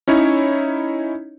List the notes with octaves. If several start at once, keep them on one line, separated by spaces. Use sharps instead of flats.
C#4 D#4 E4 C#5